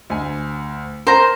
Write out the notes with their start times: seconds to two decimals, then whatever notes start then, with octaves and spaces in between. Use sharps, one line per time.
0.10 D2 G#5
1.07 A#4 C5 A#5